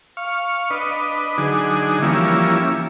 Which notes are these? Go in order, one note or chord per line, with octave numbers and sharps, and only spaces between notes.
F5 C#6
D4 B4 D#5
D3 F#3 D4 D#4 G#4
E3 F3 G3 A#3 C#4 E4